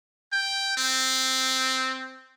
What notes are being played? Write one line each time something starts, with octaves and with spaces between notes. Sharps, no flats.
G5
C4